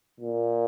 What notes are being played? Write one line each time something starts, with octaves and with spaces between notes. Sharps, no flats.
A#2